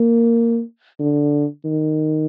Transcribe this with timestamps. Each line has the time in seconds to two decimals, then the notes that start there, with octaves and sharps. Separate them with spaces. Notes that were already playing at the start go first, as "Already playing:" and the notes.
Already playing: A#3
1.00 D3
1.65 D#3